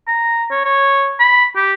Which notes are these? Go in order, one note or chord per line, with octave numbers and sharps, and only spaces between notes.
A#5
C#5
C#5
B5
G4